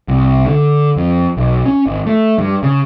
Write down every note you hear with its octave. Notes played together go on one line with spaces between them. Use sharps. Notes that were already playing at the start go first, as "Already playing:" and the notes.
C2
D3
F2
B1
C#4
G#1
A3
G2
C#3